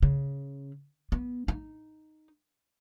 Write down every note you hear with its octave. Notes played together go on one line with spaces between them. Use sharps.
C#3
B3
D#4